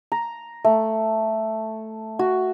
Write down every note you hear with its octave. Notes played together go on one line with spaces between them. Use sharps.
A#5
A3
F#4